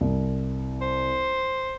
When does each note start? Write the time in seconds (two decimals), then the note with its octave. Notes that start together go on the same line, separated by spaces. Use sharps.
0.01 C2
0.81 C5